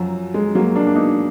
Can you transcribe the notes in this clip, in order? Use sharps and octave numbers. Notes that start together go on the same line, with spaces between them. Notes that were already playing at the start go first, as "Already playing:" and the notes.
Already playing: F#2 F3 F#3
G#3
F#3 A#3
A#3 D4
D4
B3 D#4